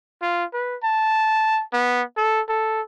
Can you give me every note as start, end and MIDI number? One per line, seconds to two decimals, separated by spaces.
0.22 0.44 65
0.53 0.76 71
0.83 1.62 81
1.73 2.02 59
2.17 2.41 69
2.49 2.81 69